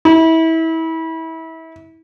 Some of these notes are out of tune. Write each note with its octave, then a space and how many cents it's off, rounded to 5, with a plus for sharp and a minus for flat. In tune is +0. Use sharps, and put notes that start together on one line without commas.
E4 -25